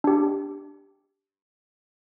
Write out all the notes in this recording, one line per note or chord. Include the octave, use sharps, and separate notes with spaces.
D4 G4